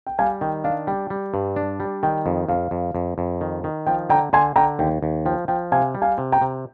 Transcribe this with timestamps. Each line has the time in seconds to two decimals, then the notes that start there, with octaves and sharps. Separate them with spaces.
0.07 G5
0.19 G3 F5 G#5
0.41 D#3 G5
0.64 D4 F5
0.87 G3 G5
1.10 G3
1.34 G2
1.56 D4
1.80 G3
2.03 D#3 G5
2.26 F2
2.49 F2 F5
2.71 F2
2.95 F2
3.18 F2
3.41 D#3
3.64 D#3
3.87 F3 G5
4.10 D3 G5 A#5
4.33 D3 G#5 C6
4.56 D3 G5 A#5
4.79 D#2 G5
5.03 D#2
5.26 F3 G5
5.48 F3 G5
5.72 C3 F5 G#5
5.95 G3
6.02 F5 G#5
6.18 C3
6.32 G5 A#5
6.41 C3